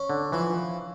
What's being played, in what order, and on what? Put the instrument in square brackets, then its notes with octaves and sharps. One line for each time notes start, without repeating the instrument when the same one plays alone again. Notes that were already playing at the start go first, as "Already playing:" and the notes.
Already playing: [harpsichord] C#4
[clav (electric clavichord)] D3
[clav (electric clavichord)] E3 [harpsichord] F3